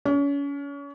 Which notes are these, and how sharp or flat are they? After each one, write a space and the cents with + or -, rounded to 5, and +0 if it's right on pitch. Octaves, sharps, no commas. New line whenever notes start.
C#4 +35